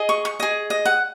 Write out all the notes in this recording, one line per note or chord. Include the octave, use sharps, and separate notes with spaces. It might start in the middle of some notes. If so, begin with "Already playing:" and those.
Already playing: G#4 D#5
C#6
C#6
G#4 D#5
D#5
F#5